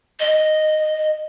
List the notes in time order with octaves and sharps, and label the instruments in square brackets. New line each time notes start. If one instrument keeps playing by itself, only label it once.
[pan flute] D#5